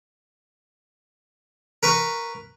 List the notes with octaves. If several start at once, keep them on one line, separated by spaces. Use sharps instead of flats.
A#4 B4 C#6